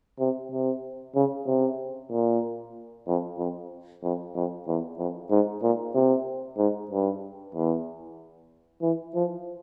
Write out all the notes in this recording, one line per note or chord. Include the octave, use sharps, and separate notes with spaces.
C3
C3
C#3
C3
A#2
F2
F2
F2
F2
E2
F2
G#2
A#2
C3
G#2
G2
E2
E3
F3